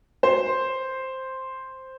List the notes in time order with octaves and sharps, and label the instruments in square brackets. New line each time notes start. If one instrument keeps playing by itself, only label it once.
[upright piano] C5